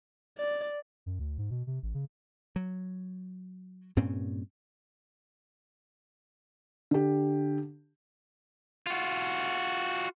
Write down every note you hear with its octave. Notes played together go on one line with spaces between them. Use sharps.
D5
F#2
D2
G#2
B2
C3
A1
C#3
F#3
G2 A#2 C4 C#4
D3 G4
F4 F#4